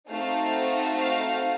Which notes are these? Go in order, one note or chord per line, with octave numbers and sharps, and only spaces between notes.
A3 C4 D#4 F#4 F5
F5